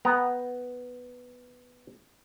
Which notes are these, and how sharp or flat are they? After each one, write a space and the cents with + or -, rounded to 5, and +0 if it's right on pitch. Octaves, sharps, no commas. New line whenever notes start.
B3 +0 G5 +0 A#5 +0